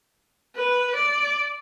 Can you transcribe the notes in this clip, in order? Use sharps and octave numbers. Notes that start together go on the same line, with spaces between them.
B4
D5